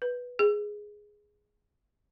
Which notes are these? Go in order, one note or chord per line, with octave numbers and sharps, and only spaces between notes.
B4
G#4